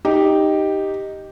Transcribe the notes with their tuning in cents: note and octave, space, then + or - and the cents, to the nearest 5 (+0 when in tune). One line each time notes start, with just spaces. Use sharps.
D#4 +0 G4 +0